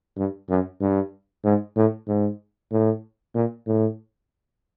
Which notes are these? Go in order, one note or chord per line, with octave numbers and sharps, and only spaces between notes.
G2
F#2
G2
G#2
A2
G#2
A2
A#2
A2